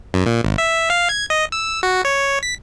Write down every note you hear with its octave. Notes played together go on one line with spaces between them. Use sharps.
F#2
A#2
G#1
E5
F5
G#6
D#5
E6
F#4
C#5
B6